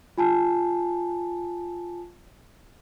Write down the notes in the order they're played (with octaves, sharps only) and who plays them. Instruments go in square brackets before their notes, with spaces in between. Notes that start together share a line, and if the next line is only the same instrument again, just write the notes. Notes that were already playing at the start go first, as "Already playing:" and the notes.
[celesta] F4 G#5 A5